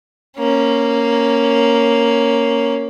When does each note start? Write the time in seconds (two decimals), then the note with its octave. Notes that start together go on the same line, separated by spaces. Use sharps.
0.37 A#3 C#4